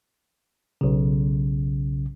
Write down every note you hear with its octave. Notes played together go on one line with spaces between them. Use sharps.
B1 C#3